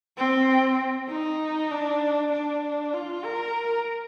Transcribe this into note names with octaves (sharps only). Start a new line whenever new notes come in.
C4
D#4
D4
D4
F4
A#4